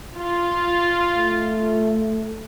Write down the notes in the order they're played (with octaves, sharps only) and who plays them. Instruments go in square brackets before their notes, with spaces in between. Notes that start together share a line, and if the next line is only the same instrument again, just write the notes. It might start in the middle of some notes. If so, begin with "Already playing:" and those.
[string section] F4
[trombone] A3